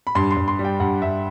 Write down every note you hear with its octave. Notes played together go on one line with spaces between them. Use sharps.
B5
G2 C6
C6
G2
C6
G3
G5
G2 F#5
G2 E5